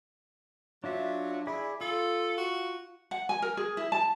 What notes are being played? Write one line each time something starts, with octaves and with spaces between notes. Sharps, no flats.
F#3 D4 F4 E5
E4 G#4 D5 B5
F4 A4
F#4
F#5
G#5
A#4
G#4
E4
A5